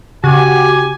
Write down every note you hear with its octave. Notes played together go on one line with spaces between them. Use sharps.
C#3 F#4 G4 G#5